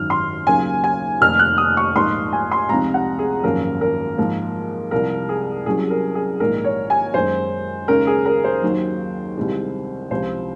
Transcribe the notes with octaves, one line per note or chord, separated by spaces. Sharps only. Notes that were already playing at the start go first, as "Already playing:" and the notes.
Already playing: G#1 F#2 D#3 F6
C6
D#2 C#3 F#3 A#3 G#5
G#5
F1 F2 D#3 A#3 D#4 F6
F#6
D#6
C#6
A#1 G#2 F3 A#3 D#4 C6
G#5
C6
C#2 C3 F3 C4 D#4 A#5
F#5
G#4
G#1 F#2 F3 A#3 C#4 A#4
A#4
G#2 F3 A#3
C2 C3 F3 A#4
G#4
C2 C3 F#3 C#4 G#4
A#4
G#4
A#1 G#2 D#3 A#4
C#5
G#5
F#2 D#3 G#3 C5
D#2 C#3 G#3 C#4 A#4
G#4
A#4
C5
D#2 D#3 F#3
C2 C3 D#3 G#3
C#2 C3 F3 C5